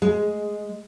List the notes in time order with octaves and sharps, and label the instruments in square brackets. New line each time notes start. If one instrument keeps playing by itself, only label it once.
[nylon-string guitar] G#3